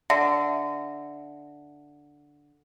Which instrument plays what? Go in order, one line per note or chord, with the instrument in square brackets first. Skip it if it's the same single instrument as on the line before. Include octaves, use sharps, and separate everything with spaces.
[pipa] D3 [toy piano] E5